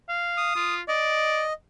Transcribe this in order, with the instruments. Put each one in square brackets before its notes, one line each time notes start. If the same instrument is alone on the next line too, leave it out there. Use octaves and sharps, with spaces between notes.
[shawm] F5
[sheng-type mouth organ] D#6
[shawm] F4
[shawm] D5 [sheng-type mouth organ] D#5